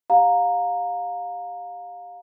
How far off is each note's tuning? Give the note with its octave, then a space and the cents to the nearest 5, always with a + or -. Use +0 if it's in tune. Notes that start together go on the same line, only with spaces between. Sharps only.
G4 +0 F5 +25 A#5 +0